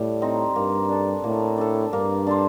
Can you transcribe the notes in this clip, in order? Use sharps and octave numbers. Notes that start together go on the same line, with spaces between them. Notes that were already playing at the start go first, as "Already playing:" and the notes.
Already playing: A2 G3
C4 D#4
G2 A#3
D4 A4
A2 A#3
D4 A4
G2 A#3
D4 A4 C5